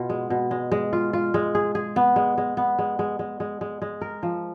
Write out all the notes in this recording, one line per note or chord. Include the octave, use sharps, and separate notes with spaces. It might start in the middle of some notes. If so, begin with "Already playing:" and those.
Already playing: B2 B3 F4
G#3
B2
G#3
G#3
F4
F4
G#3
G#4
G#4
B3
G#3
G#3
B3
G#3
G#3
G#3
G#3
G#3
G#3
A#4
F3